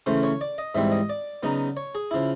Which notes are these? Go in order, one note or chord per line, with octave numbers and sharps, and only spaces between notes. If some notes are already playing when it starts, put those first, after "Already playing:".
C#3 E3 A3 C#4 C5
C#5
D5
D#5
G#2 E3 G3 C4 E5
D#5
D5
C#3 F#3 B3 D#4
C#5
G#4
C#3 F3 E4